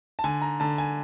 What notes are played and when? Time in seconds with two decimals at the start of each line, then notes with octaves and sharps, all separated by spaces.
0.19 A5
0.24 D3 G#5
0.42 A#5
0.60 D3 A5
0.78 G#5